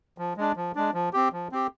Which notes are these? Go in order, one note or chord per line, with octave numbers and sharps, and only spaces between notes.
F3
G#3 D4
F3
G#3 D4
F3
C4 G4
F3
C4 G4